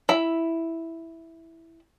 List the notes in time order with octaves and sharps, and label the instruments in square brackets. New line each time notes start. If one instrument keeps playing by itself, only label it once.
[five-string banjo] E4 B5